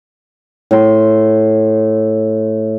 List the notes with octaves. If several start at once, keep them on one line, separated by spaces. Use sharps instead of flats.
A2 C6